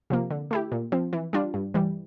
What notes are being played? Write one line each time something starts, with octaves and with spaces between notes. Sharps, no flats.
C3 F3 A#3
D3
A3 E4 G4
A#2
F3 C4
E3
G3 D4 F4
G2
E3 G3